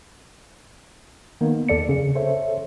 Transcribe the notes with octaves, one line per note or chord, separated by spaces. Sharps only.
D#3 A#3 B3
E2 A4 D5 C#7
C#3
A4 C5 C#5 E5